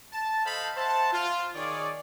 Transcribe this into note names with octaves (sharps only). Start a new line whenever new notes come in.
A5
A4 C5 D#5 F5 A5 B5
C5 E5 F#5 A5
F4
D#3 G#4 C#5 D5